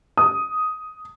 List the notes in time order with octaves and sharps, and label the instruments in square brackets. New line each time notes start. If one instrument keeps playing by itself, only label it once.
[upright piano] D#6